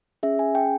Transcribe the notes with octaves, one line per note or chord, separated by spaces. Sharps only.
C#4 G#4 E5
G#5
G5